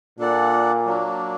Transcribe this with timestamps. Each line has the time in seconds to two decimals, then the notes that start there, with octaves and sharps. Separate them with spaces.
0.19 A#2 D4 A4 D5 F#5
0.86 F#3 A#3 D4